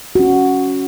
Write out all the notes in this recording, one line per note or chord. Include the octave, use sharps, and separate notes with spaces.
C#4 F#4